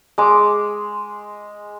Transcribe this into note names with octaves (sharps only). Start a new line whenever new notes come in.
G#3 D6